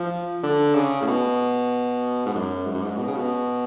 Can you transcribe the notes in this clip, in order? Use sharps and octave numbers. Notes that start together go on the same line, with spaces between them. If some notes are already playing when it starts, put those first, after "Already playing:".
Already playing: F3
D3
C#3
A2
B2
G#2
F#2
G#2
F#2
G#2
B2
C#3
B2